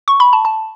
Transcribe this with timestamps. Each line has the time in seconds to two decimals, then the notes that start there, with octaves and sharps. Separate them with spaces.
0.08 C#6
0.20 B5
0.33 A5
0.45 A5